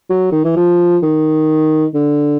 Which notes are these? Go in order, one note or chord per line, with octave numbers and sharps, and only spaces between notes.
F#3
D#3
E3
F3
D#3
D3